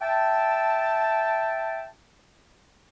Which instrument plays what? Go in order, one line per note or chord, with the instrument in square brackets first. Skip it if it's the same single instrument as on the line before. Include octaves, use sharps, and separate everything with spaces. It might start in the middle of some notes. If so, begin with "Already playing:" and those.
[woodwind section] E5 G5 A5